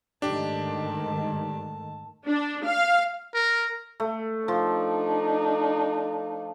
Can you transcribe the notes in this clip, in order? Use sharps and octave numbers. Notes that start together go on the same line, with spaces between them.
G#2 D#3 A3 D4 G4 A5
D4
F5
A#4
A3
F3 D4 D#4